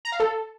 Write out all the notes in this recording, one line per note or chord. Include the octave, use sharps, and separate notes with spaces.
A#5
F5
A4